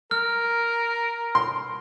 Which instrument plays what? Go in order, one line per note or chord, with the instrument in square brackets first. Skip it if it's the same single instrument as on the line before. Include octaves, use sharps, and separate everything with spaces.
[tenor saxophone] A#4 [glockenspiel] F6
[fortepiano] C6